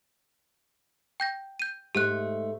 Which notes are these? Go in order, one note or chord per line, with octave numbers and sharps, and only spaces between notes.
G5 G6 A#6
G6 D#7
G#2 A3 G4 F#6